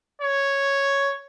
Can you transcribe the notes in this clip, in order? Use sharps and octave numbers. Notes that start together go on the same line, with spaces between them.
C#5